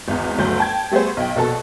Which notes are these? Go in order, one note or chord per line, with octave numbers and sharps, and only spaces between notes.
G#1 E2
G1 D2 F#3 G6
G5 A5 G#6
G3 A3 B3 G#4 C5
B1 G5
A#1 B2 A4 A5